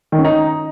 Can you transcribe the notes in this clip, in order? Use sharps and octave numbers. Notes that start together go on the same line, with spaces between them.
D#3
C#4
D#4